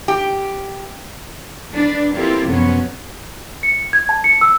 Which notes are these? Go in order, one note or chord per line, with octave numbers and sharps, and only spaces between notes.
G4
D4 B4
A#3 C4 E4 F4 G4 A4
F#2 C3 F3 F#3 B3 C#4
C#7
G#6
A5
C#7
E6